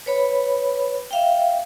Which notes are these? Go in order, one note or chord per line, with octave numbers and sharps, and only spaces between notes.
B4 C#5 B5
E5 F5 G5